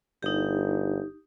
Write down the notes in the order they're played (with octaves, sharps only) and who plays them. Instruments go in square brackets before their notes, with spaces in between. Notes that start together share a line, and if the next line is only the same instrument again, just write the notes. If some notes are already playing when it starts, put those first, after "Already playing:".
[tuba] G1 [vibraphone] D#4 G4